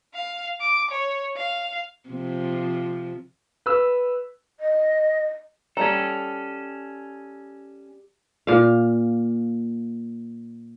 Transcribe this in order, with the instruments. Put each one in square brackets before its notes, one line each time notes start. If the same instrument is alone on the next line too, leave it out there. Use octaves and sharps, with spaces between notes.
[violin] F5
D6
C#5
F5
[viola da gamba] C3 F3
[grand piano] B4 E6
[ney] D#5
[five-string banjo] G3 A#5 [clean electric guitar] C#4 A4
[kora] A#2 F5